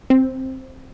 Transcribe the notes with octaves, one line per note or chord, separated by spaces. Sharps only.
C4